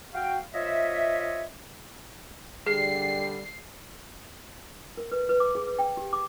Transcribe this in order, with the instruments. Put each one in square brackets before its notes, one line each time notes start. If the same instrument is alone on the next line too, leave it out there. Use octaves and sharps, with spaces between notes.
[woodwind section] F#4 F5 G5
F4 C5 C#5 D#5 E5
[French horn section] D3 G3 [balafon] G#4 [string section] C7
[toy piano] A#4
B4
B4
D6
G#4
B4
G5
G4
D6